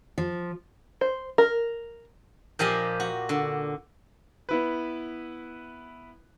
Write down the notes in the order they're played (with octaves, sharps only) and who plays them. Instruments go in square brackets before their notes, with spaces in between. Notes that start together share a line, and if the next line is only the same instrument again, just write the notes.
[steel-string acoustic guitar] F3
[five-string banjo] C5
A#4
[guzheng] A#2 F3 G4 D#5 G#5
F#4
D3
[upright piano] B3 E4 B4